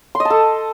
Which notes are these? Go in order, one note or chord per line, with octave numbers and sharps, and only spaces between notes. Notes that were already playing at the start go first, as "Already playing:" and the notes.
C6
D#5
A5
A4